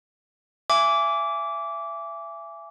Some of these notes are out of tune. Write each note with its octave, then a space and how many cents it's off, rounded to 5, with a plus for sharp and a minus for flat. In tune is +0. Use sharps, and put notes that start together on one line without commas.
E5 +30 G#5 +0 D6 -20